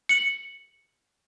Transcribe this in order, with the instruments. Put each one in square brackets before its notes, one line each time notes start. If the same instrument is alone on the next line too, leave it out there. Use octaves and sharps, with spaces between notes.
[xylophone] C#7 F#7